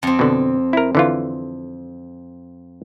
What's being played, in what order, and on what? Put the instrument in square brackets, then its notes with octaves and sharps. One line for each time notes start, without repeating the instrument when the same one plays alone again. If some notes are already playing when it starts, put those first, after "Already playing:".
[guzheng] F2 C4
[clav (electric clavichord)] B2 D3
E4 A#4
D3 E3 F4